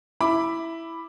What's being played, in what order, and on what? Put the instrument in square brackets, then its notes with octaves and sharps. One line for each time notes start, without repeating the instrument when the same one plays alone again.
[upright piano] E4 B5 D6